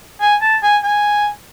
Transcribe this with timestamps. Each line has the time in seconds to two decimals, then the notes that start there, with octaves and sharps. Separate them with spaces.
0.21 G#5
0.41 A5
0.63 G#5
0.84 G#5